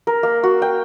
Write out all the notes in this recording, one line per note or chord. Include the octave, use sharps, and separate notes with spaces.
A#4
A#3
F#4
G5